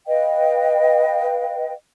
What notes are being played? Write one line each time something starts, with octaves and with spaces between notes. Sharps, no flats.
B4 D#5 F5 G5